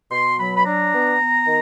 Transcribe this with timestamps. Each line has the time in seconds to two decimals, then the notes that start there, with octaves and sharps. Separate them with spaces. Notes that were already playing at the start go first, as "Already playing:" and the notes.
0.11 B2 C6
0.38 F#3 B5
0.56 B5
0.65 D4 A#5
0.92 B3
1.18 B3
1.45 D#3